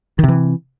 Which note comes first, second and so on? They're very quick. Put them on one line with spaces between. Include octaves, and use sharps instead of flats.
D#3 C3 E3